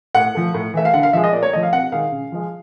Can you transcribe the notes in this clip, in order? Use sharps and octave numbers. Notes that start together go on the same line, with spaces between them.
A2 F#5
F3 A3
A2
E3 A3 E5
F5
D3 F#5
F5
F3 G#3 E5
D#5
A#2 D5
C#5
F3 A3 D#5
F5
C3 F#5
D#3 G#3 F5
C#3
F3 G#3